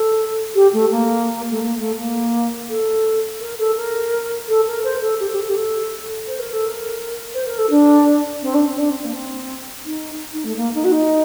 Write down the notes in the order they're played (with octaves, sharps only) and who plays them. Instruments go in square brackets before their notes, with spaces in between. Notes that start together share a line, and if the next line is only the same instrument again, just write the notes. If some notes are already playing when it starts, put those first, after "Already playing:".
Already playing: [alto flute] A4
G4
A3
A#3
A3
A#3
A3
A#3
A4
A#4
A4
A#4
A4
A#4
C5
A4
G4
A4
G4
A4
G4
A4
C5
A#4
A4
A#4
C5
A#4
A4
D4
C4
D4
C4
D4
C4
A#3
C4
D#4
D#4
A3
A#3
D#4
F#4
D#4